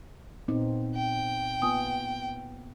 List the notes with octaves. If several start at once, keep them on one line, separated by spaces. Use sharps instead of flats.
A#2 B3 C4 D#4
G5
A#3 B3 F4 G#5 D#6